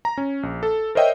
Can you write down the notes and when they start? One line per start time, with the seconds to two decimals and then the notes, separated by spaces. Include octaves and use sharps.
0.05 A#5
0.18 C#4
0.43 A#1
0.63 A4
0.95 A#4 C5 C#5 D#5 E5 G5